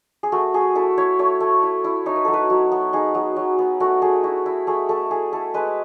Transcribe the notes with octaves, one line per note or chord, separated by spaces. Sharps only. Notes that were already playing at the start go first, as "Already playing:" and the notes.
G#4
A3 F#4
A3 G#4
E4 A4
E4 C#5
A3 C#5
A3
E4
E4
D#4 C#5
B4
F#3 A4
B4
F#3
B3
D#4 G#4
F#3
F#3
B3
A3 F#4
A3 G#4
E4 F#4
E4
A3 G#4
A3 A4
E4 G#4
E4 A4
G#3 B4